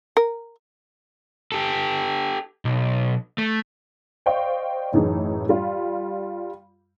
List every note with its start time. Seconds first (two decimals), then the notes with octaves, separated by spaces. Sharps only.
0.17 A#4
1.52 G4 A4
2.65 B1
3.38 A3
4.26 C5 D5 D#5 F5 G5 C#6
4.93 F#2 A2 E3 D#4 G#4
5.49 G3 F4